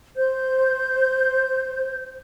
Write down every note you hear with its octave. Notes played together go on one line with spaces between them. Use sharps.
C5 G6